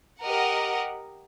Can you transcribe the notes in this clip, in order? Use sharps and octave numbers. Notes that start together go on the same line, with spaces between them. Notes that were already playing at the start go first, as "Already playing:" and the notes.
G4 A#4 D#5 F#5